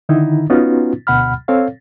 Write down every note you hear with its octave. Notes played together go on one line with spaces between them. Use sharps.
D3 D#3 D#4 E4
B3 C#4 D#4 F4 F#4 B4
D2 B2 F#5 B5 F6
C4 A4 C#5 F5